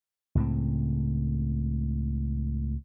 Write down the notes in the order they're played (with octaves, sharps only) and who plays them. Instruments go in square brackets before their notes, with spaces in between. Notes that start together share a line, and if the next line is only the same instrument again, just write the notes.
[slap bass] C#2 A2 C#3 C4